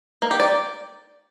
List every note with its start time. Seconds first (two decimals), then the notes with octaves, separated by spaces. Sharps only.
0.22 A#3
0.31 G4
0.40 D5